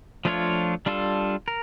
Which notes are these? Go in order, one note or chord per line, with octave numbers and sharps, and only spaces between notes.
F3 A3 D4 F4 C#5
G3 D4 F4 A4
A#4